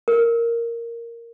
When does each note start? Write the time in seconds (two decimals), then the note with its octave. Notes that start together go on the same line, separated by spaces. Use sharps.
0.08 A#4